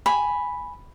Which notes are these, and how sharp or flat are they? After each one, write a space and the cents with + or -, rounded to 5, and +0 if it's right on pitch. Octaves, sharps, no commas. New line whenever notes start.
G#5 +0 B5 +0